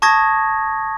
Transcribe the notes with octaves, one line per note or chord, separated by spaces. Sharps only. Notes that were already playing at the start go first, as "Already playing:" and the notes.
A5 C#6 D#6 G#6 A#6